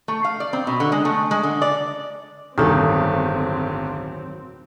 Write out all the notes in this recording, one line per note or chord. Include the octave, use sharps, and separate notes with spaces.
A3
F5
D5
C4
B2
D3
G#3
A3
G#3
D3
D5
D1 G1 G2 D#3 F#3 C4 A4